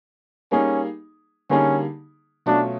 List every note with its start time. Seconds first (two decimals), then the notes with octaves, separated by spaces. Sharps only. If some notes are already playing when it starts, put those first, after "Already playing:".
0.51 G3 A#3 C#4 D#4 G#4
1.50 D3 G3 A#3 C#4 D#4 G#4
2.46 B2 F#3 A3 C#4 D4 F4